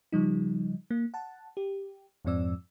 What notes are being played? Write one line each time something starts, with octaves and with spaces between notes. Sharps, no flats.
C#3 F3 G3 D#4
A#3
F#5 A5
G4
F2 G#2 F3 C4 D5 E6